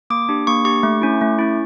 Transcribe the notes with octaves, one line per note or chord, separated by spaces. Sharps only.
A#3 D6
D4 G4
A#3 C#6
D4 G4 C#6
A3
C#4 E4
A3
C#4 E4